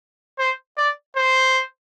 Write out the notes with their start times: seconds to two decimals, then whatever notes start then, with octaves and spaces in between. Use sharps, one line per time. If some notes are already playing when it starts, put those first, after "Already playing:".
0.39 C5
0.77 D5
1.16 C5